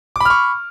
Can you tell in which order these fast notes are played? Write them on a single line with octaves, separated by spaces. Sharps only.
D6 B5 F6 C#6